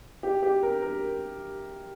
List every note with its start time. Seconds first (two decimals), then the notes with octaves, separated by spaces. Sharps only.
0.23 G4
0.43 G4
0.63 A#4
0.82 A#4